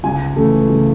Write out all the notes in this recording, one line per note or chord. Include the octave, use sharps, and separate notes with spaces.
C#2 G#5
C#3 E3 A3
C#2